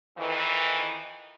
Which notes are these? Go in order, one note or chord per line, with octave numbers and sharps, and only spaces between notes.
F2 D#3 E3